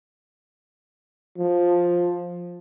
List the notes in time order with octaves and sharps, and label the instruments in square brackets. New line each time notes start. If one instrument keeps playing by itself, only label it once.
[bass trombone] F3